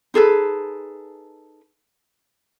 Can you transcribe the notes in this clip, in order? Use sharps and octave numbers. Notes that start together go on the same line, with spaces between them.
D#4 G#4 A4 B4